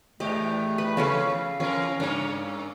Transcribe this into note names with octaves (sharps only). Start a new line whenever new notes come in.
E2 A2 A3 G4 D#5
B4
C#3 E3 C#4 A4 F5
E3 C#4 A#4
G2 A#3 C#4 D4 C#5